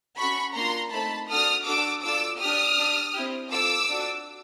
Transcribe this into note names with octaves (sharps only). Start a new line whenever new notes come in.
C#4 F#4 A4 B5 C#6
A#3 D4 F4 A#5 C6
A3 C4 D#4 A5 B5
D4 F#4 A4 D#6 F6
D4 F#4 A4 D6 E6
D4 F4 A4 D6 E6
D4 G4 D#6 F6
D4 G4
C4 E4 G4
C4 F4 A4 D6 E6
D4 F#4 A4